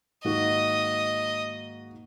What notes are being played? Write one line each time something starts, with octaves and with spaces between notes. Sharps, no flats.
G#2 D#3 A#3 D#4 F#4 D#5